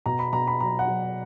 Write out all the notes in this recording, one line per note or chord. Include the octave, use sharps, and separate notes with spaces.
B2 A#5
B5
B2 A#5
B5
F#3 A#5
F#5
F#3